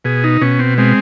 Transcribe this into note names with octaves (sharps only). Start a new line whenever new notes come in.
B2 G#4
D#4
B2 C#4
C4
G#3 C4